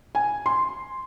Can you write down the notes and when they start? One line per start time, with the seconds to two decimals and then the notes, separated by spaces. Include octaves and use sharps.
0.15 G#5
0.46 C6